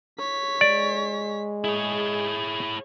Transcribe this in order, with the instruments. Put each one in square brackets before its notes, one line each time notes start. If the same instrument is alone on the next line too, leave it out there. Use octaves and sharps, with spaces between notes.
[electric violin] C#5 B6
[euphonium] G#3 [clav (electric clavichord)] D5
[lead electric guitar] E4 C#5 [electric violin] G#4